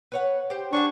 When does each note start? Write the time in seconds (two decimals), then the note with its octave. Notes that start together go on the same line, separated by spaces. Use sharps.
0.12 B4 C#5 F#5
0.50 G4 C5
0.73 D4 G#4 C5 F#5 C#6